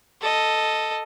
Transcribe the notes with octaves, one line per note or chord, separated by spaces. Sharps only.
A4 D#5